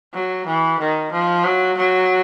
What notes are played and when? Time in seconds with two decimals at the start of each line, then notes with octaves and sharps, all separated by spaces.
0.14 F#3
0.46 E3
0.79 D#3
1.11 F3
1.45 F#3
1.77 F#3